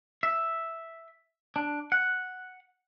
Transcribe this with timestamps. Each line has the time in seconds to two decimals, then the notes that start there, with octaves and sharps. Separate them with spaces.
0.23 E5
1.56 D4
1.92 F#5